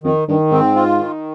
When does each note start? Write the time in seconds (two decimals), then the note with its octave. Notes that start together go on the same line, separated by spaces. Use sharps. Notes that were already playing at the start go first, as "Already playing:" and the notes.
0.04 F2 D#3
0.28 G2 D#3
0.51 G#2 C4
0.76 F4
0.99 D#3